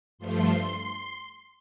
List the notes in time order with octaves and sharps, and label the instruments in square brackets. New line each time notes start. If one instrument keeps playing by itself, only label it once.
[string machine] G2 F3 A3 C6